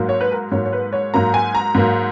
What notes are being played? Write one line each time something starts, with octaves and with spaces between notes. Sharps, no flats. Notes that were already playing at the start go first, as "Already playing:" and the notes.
Already playing: G#2 F#3 A#3
C#5
B4
A#4
G#2 F#3 A#3 C#5
C#5
B4
C#5
G#2 F#3 A#3 A#5
G#5
A#5
G#2 F#3 A#3